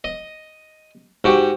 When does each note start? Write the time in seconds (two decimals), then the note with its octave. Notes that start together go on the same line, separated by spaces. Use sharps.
0.04 D#5
1.24 G#2 F#4 G4